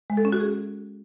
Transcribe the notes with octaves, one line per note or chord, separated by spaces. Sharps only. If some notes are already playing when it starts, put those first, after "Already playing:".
G#3
A4
C#4
F#4
G#4